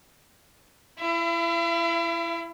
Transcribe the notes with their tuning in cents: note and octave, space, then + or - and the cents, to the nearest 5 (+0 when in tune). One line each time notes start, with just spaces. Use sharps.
E4 +25 E5 +45